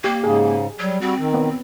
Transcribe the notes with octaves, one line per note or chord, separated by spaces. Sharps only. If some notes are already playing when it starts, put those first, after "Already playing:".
A#3 G4
G#2 C#3 G#4
F#3 G3
G3 C4 F#4
D#3
B3